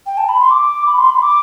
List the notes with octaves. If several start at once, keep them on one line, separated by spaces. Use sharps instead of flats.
G5
A5
B5
C6
D6
B5
C6
B5
D6